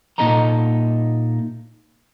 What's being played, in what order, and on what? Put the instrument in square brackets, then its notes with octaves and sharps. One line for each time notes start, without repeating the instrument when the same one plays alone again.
[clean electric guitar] A#2 D#4 A4 D#5 A#5